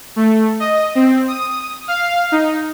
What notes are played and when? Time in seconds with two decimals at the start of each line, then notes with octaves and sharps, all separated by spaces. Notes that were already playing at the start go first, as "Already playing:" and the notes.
0.16 A3
0.60 D#5
0.95 C4
1.28 D#6
1.88 F5
2.32 D#4